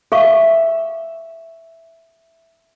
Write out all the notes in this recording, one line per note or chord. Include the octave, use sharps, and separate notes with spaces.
G#4 E5 F5 C#6